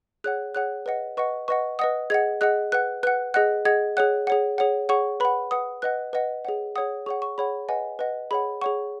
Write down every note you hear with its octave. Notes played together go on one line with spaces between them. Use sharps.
G#4 C#5 F#5 F#6
G#4 C#5 F#5 F#6
B4 D#5 F#5
B4 D#5 F#5 C#6
B4 D#5 F#5 C#6
B4 D#5 F#5 D#6
G#4 D#5 F#5 G#6
G#4 D#5 F#5 F#6
B4 F#5 F#6
B4 F#5 F#6
G#4 D#5 F#5 F#6
G#4 D#5 F#5 G#6
G#4 C#5 F#5 F#6
G#4 C#5 F#5
G#4 C#5 F#5
G#4 C#5 F#5 C#6
B4 F#5 B5
B4 F#5 D#6
B4 D#5 F#5 F#6
B4 D#5 F#5
G#4 C#5 F#5
G#4 C#5 F#5 D#6
G#4 C#5 F#5 C#6
C#6
G#4 C#5 F#5 B5
B4 D#5 F#5 G#5
B4 D#5 F#5
G#4 C#5 F#5 B5
G#4 C#5 F#5 C#6